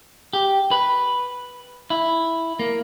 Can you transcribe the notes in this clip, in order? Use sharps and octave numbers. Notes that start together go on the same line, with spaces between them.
G4
B4
E4
A#3